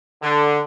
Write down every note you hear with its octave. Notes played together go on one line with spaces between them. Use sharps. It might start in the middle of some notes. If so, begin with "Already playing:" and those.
D3